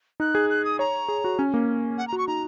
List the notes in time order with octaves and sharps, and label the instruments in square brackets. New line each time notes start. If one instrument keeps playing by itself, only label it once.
[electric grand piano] D#4 [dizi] F#6
[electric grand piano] G#4
[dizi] F#6
D#6
[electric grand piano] C#5 [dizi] A#5
[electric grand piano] G#4
F#4
C#4
A#3
[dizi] F#5
[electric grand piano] F#4 [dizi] A#5
[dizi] C#6
[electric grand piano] D#4 [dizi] A#5